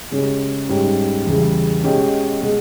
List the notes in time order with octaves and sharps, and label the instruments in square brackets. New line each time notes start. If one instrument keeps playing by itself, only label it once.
[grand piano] C#3 G#3 C#4 G4
G#2 G3 C#4 G4
E2 C#3 E3 G3
B2 G#3 C#4 G4
B2 G#3